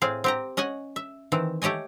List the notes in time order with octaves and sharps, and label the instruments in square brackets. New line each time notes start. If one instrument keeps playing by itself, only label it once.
[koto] A2 C4 G#4 F5
C4 G4 A#5
C#4 D#5 F#5 G#5
E5
D#3 E3 C4
A3 G4 C#5 D#5 G#5